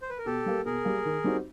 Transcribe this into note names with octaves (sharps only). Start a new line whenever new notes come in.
C5
B4
A#4
B2 G4 A4
G3 A#3
B2 G#4 A#4
G3 A#3
D#3
G3 C4 D#4 F#4